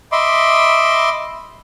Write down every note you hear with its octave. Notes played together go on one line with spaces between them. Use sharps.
D#5 E5 B5 C6 D6